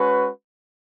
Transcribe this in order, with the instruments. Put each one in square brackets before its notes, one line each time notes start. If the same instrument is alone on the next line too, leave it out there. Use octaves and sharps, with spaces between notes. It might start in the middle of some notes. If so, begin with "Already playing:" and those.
Already playing: [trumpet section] G#3 C#4 F#4 B4